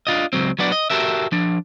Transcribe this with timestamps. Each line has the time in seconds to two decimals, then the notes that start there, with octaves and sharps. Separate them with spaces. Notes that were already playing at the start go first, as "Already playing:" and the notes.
0.07 D4 F4 D#5
0.33 C#2 G2 F#3 C4
0.59 F#3 B3 D4 D5
0.72 D#5
0.90 F#4 G4 A4 A#4 E5
1.32 F3 D4